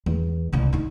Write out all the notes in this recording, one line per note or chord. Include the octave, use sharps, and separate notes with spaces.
E2
C2 C#3
D4 D#4